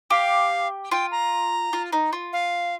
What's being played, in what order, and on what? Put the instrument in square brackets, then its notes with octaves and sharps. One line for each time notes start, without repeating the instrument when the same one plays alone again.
[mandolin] G4 [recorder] F5
[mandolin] F4 [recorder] G5
[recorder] A#5
[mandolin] F4
D#4
F4
[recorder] F5